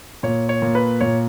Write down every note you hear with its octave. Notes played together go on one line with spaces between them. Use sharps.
A#2 C#5
C#5
A#2
B4
A#2 C#5